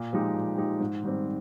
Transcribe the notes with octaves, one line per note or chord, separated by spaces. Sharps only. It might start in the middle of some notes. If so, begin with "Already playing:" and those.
Already playing: A#2
F3 G#3 D#4 G4
A#2
F3 G#3 D#4 G4
G#2
D#3 G3 C4